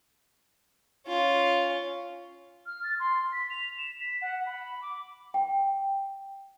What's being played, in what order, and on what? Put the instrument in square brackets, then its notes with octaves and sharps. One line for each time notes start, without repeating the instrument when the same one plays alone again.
[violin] C#4 F4
[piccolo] F6
A6
C6
B6
F7
E7
B6
F#5
B5
D6
[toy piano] G5